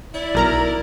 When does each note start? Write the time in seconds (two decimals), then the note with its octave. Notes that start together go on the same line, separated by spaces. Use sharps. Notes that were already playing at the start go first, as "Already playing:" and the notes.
0.14 E4 D5
0.35 B1 A#4 A#5